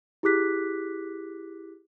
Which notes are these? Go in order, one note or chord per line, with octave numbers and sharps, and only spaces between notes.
E4 G4 G#4 D6 F#6 B6